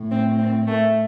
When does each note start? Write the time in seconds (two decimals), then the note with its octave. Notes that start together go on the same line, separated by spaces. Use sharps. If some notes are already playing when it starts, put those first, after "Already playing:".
Already playing: A2
0.11 C4
0.39 C4
0.67 A3